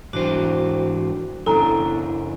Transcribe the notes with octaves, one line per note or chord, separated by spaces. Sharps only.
G#2 E3 D4 F#4 C5
F#2 C#3 D4 E4 A4 G#5 A#5